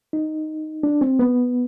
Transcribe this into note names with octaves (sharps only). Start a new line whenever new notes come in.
D#4
D4
C4
B3